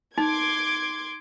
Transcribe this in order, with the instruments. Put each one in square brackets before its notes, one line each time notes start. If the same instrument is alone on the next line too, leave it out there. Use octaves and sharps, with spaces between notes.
[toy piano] D#4 [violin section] C6 D6 G#6